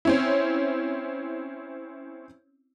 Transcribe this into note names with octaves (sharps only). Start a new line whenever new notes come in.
C4 C#4 E4